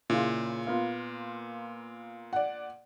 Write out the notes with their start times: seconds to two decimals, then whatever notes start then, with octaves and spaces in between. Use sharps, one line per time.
0.10 A#2 C#3 E4 F4
0.67 A#3 B3 F4
2.33 D5 F#5